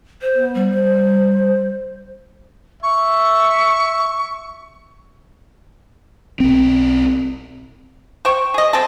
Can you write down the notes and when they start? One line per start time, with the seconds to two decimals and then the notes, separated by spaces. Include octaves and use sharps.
0.21 C5
0.35 B3
0.55 G3
0.73 C5
2.83 E5 C#6
6.40 B1 C4
8.25 C5 G5 C#6
8.54 G#4 D#5
8.73 G3 C4 G#4 A4